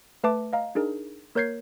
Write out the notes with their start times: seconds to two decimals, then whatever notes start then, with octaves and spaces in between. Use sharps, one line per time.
0.24 A3 B4 E5 A5 D6
0.53 D#5 F5 A#5
0.75 D4 D#4 G#4 A#4
1.35 A#3 A#4 C#5 G6 G#6 C7